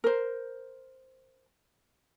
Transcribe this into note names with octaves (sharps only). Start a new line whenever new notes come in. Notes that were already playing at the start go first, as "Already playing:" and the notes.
A#4 C5